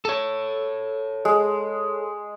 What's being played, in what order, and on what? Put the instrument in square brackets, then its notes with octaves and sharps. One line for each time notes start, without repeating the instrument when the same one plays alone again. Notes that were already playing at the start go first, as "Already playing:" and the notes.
[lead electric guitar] A4 C#5
[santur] G#3